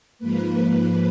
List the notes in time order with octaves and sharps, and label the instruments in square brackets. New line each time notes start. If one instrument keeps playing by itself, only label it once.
[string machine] G#2 F3 A#3 B4